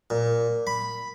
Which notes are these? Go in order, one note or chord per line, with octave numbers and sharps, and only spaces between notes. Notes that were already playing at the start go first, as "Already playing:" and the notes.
A#2
B5